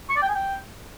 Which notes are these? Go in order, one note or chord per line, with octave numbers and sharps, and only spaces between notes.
C#6
D5
G5
G#5
G5